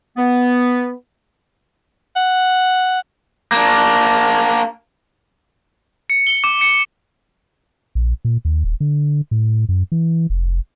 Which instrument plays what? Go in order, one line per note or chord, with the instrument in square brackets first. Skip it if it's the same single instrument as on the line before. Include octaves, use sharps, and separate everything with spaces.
[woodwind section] B3
[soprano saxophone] F#5
[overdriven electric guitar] A#3 D4
[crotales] C#7
G7
D6
C#7
[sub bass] A#1
A#2
D#2
D#1
D3
A2
F#2
E3
F1